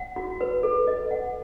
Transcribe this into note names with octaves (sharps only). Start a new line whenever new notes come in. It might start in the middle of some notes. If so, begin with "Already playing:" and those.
Already playing: F#5
F#4
B4
A4
D#5
F#5